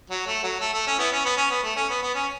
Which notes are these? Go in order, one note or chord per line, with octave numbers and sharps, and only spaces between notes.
F#3
A3
F#3
A3
A3
C#4
B3 E4
C#4
B3
C#4
B3
A3
C#4
B3
B3
C#4